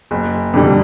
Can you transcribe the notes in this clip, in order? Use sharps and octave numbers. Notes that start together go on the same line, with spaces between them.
F#1
F2 D3 G3